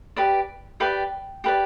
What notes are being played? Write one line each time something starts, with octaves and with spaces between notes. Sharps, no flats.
G4 B4 D5
G4 B4 D5 G5
G4 B4 D5